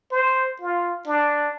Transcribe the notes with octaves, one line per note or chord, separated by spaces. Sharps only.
C5
F4
D4